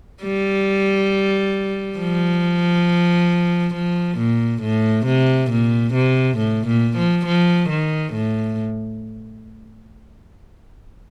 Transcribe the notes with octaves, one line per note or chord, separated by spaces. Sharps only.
G3
F3
F3
A#2
A2
C3
A#2
C3
A2
A#2
F3
F3
D#3
A2